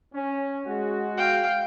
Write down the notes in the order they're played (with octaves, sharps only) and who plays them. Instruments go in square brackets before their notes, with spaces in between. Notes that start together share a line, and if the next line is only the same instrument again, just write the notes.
[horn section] C#4
G#3 F#4
[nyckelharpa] F5 G5